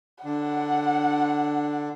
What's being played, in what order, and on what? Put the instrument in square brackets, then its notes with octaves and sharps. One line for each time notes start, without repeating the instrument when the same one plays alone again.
[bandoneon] D3 D4 [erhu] F#5